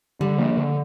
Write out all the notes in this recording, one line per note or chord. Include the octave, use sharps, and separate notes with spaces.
D3 G3
F3 A#3
D3